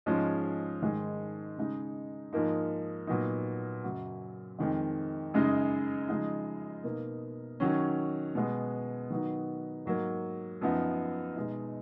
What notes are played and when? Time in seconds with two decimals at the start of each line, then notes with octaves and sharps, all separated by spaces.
0.06 G#2 F3 G#3 C#4
0.82 G#2 D#3 G#3
1.57 C#3 G#3 D#4
2.33 G#2 F3 A#3 D#4
3.07 A#2 F#3 B3 D#4
3.83 F#2 C#3 F#3
4.59 F2 D#3 G#3
5.34 F#2 C#3 G#3 D#4
6.09 C#3 F3 G#3 D#4
6.84 B2 A#3 D#4
7.60 D#3 F#3 C#4
8.35 B2 G#3 B3
9.10 D#3 F#3 B3 D#4
9.86 G#2 F#3 A#3
10.61 F#2 F3 B3 D#4
11.36 B2 G#3 D#4